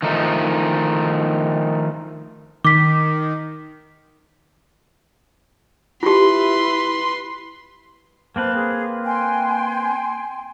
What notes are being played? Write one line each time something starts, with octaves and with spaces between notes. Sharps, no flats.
D#3 F3 A3 D#4
D#3 D6 B6
E4 F4 G4 B4 C6
A#3 C4 B4 C5 A5
G#4
G5 G#5 C6